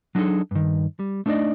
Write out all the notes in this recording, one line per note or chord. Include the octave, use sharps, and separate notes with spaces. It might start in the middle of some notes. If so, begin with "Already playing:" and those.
F#3 D4 D#4 F#4 G#4 A4
G2 D#3
G3
A3 D4 D#4 A4 D5 D#5